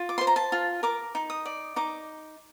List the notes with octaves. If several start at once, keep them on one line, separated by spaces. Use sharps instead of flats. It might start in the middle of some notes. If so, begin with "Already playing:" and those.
Already playing: F4
D6
C5 C6
A#5
A5
F4
A#4 D6
D#4
D#6
D5
D#4 D6